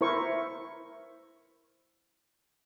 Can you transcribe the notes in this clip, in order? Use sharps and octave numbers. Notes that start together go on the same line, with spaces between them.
E4 A#4 C5 C#6